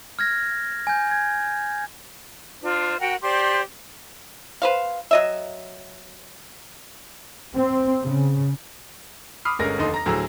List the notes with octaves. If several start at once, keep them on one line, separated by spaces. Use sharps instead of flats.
F6 G#6 A#6
G#5 G6
G#6
D4 F4 C5
F#4 A#4 F#5 G5
G4 C5 D5 C6
B4 C5 F5
F#3 D#5 E5
C4
C#3
B5 D6 D#6 F6 C7
G1 D3 G#3 C#4 A#4 A#6
F1 D#2 D3 D#4 C6
A#5 A#6
D2 A2 F#3 G#4 A#5 E6